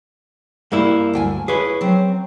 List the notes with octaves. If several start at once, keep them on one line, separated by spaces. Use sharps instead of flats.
G2 A#3 E4
D2 G5 G#5
E4 G#4 B4 C#5
F#3 C4